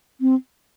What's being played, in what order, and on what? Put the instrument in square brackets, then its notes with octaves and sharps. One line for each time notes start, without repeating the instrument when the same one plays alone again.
[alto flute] C4